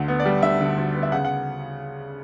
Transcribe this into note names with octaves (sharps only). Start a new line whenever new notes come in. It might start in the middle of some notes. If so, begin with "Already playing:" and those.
Already playing: D2 D3
B3
D5
G3
D3 E5
D3
D2
B3
E5
C#3 F#5
F#5